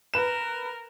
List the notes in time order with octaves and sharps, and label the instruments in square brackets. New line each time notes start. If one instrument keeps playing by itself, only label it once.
[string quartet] A#4 [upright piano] B4 E7